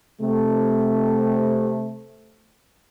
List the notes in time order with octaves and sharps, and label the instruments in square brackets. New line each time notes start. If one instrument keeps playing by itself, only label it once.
[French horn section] C3 A3